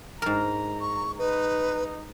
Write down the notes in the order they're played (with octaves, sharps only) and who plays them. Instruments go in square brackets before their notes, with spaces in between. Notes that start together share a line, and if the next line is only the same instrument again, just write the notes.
[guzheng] G#2 A#4 [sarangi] A#5
[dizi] C#6
[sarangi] D#4 [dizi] B4